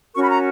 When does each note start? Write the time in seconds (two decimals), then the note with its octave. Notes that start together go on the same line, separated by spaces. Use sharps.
0.15 C#4 F#4 A#4 C#6
0.23 B5
0.29 A#5